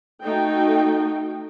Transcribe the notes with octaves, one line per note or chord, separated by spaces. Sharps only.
A3 D#4 F#4 G5